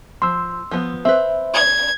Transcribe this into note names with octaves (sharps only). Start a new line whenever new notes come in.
F3 C6 E6
F3 B3
C4 B4 E5
G#6